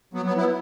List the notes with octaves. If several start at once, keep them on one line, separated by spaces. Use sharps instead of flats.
F#3 B3
F#3 B3
B3 E4